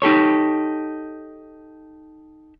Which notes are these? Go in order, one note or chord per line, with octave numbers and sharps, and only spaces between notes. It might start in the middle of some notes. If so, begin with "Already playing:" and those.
D#4 G4 A4 C#5